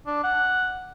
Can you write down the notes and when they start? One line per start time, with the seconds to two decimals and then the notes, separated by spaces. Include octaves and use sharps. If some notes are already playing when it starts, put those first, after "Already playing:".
0.06 D4
0.24 F#5